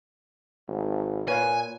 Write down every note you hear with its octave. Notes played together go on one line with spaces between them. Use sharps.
G#1
A#2 B4 C#5 F5 G#5